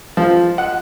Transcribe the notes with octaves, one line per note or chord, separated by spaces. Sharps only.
F3
F#5